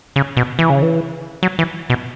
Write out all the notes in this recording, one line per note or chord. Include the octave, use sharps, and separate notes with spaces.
C#3
B2
E3
C#3
E3
F#3
E3
B2